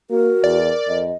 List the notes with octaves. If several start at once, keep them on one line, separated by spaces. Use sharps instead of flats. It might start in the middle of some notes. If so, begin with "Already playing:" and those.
A#3 F#4 A#4
E2 D5
F2 D#5